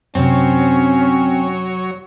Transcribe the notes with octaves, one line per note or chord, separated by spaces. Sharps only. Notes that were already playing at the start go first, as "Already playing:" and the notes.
F#2 C3 F#3 C4 C#4 C#5